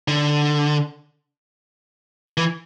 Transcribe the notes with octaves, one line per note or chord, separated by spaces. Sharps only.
D3
E3